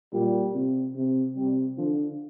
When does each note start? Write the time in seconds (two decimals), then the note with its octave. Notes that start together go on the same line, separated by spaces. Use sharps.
0.13 A#2 G3
0.54 C3
0.95 C3
1.36 C3 G3
1.77 D3 F3